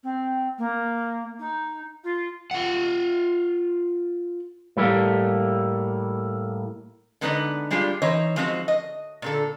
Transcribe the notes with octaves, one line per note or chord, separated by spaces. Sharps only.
C4
A#3
D#4
F4
F4 F#5
A2 G3 A3 A#3
D3 G#3 B3 D#4 B4 D5
G3 G#3 D4 F4 G4
E3 D#4 C5 C#5 D#5
F3 G#3 C4 D#4 F#4
D#5
A#2 D3 A4